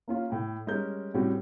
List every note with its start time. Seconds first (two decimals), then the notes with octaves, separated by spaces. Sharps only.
0.08 A#3 C#4 F4
0.30 A2 G5
0.67 G3 G#3 C#4 A#4 D#5 G6
1.14 A2 G3 C4 C#4 F#4